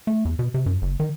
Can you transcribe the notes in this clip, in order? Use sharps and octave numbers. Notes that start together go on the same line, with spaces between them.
A3
E2
B2
C3
F#2
F#1
D#3